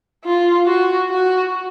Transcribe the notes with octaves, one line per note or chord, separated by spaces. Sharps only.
F4
F#4
F#4